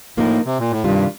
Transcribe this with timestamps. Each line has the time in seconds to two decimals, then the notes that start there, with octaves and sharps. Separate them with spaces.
0.17 A2 F3 A#3 D#4 A#4
0.46 C3
0.60 A#2
0.71 A2
0.84 G2 C3 D#3 G3 D4 F4